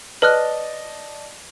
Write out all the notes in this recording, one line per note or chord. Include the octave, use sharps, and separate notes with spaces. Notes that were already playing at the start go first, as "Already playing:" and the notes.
B4 D5 D#5 A5 F6 F#6